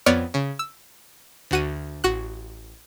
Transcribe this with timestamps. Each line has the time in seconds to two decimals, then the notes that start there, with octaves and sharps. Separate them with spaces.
0.06 F2 B3 C#5 D5 F6
0.34 C#3
0.59 E6
1.51 D2 F#4 D#7
2.04 A1 F#4 F#6